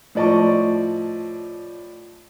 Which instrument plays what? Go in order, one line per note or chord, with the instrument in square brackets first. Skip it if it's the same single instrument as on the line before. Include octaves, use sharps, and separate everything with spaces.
[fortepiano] A2 F3 D5 D#5 A5 C#6